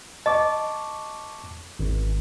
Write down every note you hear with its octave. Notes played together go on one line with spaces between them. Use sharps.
D#5 A5 C#6 D6
G#1